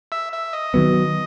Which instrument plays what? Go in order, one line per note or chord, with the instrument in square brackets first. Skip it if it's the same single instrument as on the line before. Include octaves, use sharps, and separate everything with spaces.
[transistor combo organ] E5
E5
D#5
[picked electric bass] D#3 F#3 B3